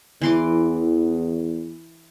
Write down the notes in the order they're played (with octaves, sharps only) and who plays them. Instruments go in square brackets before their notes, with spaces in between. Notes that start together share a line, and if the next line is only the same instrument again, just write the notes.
[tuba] E2 [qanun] E3 C6 D6